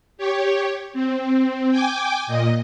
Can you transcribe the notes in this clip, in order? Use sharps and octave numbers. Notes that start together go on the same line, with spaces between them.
G4 C#5
C4
G5 G#5 D6
A#2 D#5